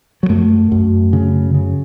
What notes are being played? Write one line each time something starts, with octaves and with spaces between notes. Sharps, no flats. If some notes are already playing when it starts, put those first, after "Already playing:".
F#3
F#2 A3
F#2
C#3
C#3